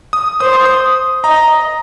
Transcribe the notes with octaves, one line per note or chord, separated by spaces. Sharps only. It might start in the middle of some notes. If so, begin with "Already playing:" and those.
D#6
C5 D#6
C6
D#6
D#5 A#5